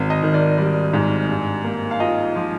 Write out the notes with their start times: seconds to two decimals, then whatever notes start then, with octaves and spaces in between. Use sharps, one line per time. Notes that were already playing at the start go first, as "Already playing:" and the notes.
Already playing: G#1
0.10 D#5
0.22 D#3
0.34 D5
0.58 G3 D5
0.93 G#2
1.29 G2
1.64 A#3
1.91 F5
2.00 F4 D#5
2.36 F3